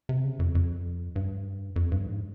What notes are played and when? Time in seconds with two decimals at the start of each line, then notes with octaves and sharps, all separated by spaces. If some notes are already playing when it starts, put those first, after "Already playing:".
0.09 C3
0.24 C#3
0.39 F2
0.55 F2
1.16 G2
1.76 F2
1.92 G2
2.07 G#2